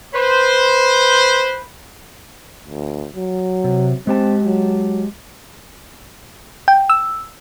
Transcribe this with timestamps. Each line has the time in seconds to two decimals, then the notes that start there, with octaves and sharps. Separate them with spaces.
0.14 B4 C5
2.67 D2
3.15 F#3
3.64 C3
4.07 G#3 C4 G4 A5
4.45 F#3
6.68 G5
6.90 E6